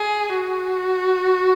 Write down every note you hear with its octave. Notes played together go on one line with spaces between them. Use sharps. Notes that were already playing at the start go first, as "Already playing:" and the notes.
Already playing: G#4
F#4